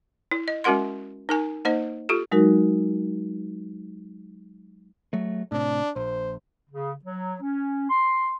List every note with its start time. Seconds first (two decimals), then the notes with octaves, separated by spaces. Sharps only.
0.31 E4
0.48 D#5
0.64 G#3 C#4 F#4 A#4 F#5 C6
1.29 D#4 A#4 G#5
1.65 A#3 D#4 C5 D#5
2.09 F4 G4 A4
2.32 F#3 G#3 D#4 F#4 A#4
5.13 F#3 A3
5.52 A2 C3 D4
5.96 A#1 C5
6.70 C#3
7.04 F#3
7.42 C#4
7.90 C6